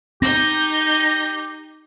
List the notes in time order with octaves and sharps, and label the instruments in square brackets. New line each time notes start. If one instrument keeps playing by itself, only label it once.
[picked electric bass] C4 [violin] D#4 G6 [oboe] G4 [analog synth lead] A#6